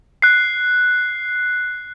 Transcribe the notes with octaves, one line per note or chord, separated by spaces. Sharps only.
F#6 C7